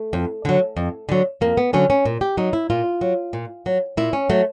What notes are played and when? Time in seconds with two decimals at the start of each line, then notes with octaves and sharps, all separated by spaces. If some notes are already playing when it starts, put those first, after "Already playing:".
Already playing: A3
0.13 F2
0.45 D3 F#3
0.77 F2
1.09 D3 F#3
1.41 F2 A#3
1.57 B3
1.73 D3 F#3 C#4
1.90 C#4
2.05 A#2
2.21 G4
2.37 F#3 D#4
2.53 E4
2.70 A#2 F4
3.01 F#3
3.33 A#2
3.66 F#3
3.97 A#2 E4
4.13 C#4
4.30 F#3 A3